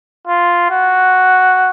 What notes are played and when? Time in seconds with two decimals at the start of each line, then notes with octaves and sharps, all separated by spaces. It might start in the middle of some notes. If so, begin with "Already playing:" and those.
0.27 F4
0.71 F#4